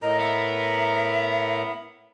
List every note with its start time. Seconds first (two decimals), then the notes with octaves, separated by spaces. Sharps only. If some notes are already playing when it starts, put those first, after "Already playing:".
0.02 A2 A#4 D#5 A#5
0.20 B3 E5